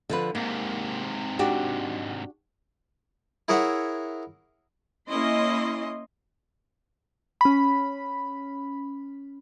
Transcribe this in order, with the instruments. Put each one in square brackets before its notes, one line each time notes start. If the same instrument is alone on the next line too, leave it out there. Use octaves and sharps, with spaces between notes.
[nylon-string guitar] D3 F3 B4
[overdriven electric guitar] G#2 C3 [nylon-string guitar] A#3
[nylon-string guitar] D4 F#4 G4
[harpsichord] E4 G#4 A#4 C#5 E5 F#5
[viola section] A#3 C#4 E4 D#5 C6
[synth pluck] C#4 B5